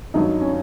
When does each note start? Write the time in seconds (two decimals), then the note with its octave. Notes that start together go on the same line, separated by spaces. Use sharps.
0.14 G2 D#3 F#3 D#4
0.41 C#4